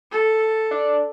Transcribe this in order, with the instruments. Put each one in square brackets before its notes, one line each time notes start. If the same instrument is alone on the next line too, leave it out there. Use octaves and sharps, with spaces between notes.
[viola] A4
[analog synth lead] D4